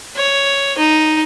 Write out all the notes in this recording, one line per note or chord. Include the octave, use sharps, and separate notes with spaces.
C#5
D#4